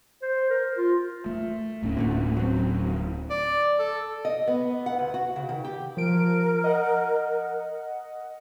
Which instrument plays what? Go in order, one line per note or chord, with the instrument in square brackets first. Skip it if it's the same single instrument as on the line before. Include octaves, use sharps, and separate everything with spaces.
[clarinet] C5
A#4
F4
[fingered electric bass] A3
D1 A2 C#4
[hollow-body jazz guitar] A#2 D3 A3
F#3 C4
[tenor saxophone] D5
A4
[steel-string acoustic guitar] D#5
B3
F#5
D2
F#4
C#3
D#3
G4
[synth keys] F3 D7 [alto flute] A#4
[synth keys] D#5 F#5